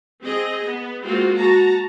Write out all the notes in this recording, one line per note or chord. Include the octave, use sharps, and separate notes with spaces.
C4 G#4 D#5
B3
G#3 A#3 C4 F4 F#4
F#4 A5 A#5